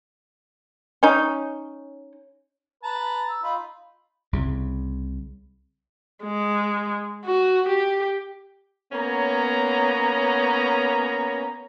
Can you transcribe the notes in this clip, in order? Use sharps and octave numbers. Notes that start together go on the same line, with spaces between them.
C#4 D#4
B4 A5 A#5
E6
D#4 F4 B5
C2 C#3
G#3
F#4
G4
A#3 B3 C#4 C#5 A#5